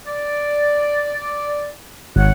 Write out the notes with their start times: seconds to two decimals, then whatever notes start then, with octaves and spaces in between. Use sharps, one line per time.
0.06 D5
2.16 G#1 C#5 F#5